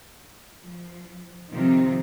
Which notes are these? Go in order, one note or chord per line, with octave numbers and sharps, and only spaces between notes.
F3
C3 D#3 F3 D#4 F4